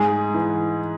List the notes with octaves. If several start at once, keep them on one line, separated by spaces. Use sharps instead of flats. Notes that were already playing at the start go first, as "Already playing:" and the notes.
Already playing: G#2 G#4
E3